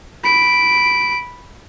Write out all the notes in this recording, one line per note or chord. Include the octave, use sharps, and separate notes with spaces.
B5 D7